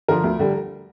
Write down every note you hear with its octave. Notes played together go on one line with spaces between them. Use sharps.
D3 F3 A#4
D2
D3 G3